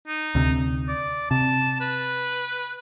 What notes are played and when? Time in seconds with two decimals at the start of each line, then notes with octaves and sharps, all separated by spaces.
0.08 D#4
0.35 D2 C3
0.88 D5
1.31 C3 A5
1.81 B4